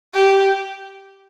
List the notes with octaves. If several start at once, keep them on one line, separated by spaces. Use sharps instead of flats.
G4